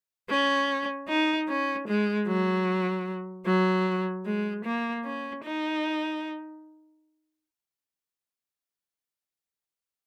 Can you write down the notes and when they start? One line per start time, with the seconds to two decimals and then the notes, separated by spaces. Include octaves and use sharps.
0.29 C#4
1.08 D#4
1.48 C#4
1.88 G#3
2.28 F#3
3.46 F#3
4.26 G#3
4.65 A#3
5.05 C#4
5.44 D#4